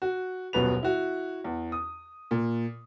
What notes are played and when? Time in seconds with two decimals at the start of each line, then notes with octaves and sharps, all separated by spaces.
0.02 F#4
0.53 D#1 F#2 B2 B4 F7
0.83 E4 F#4
1.44 E2
1.72 D#6
2.31 A#2